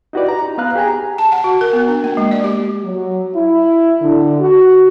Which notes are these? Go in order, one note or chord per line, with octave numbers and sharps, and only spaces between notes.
D#4 E4 F#4 G4 B4 D5
A#5
D#4
B3 B4 F5 A#5 F#6
G4 G#4 G#5 A#5
A5
F#5
F#4
A#4
B3
D4
A#3
G#3
D5
G4
F#3
E4
D3
F#4